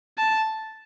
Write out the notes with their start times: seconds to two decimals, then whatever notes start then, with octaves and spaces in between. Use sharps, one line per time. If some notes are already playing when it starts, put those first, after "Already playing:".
0.18 A5